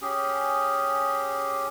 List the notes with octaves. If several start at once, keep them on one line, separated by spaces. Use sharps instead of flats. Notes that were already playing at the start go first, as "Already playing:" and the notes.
C#4 G4 G#4